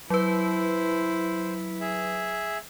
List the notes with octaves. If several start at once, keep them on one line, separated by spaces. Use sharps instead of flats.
F#3 E4 B4 C5
G#4 E5